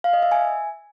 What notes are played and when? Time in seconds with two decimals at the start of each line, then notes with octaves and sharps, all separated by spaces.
0.04 F5
0.13 D#5
0.22 E5
0.32 G#5